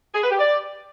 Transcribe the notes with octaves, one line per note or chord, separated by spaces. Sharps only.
G#4
B4
G4
D5